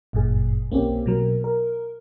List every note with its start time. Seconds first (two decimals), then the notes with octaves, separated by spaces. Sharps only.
0.13 G1 F#2 A#2 G#4
0.70 B1 A#3 C4 C#4 G4
1.06 B2 F#3 A#4
1.44 A#4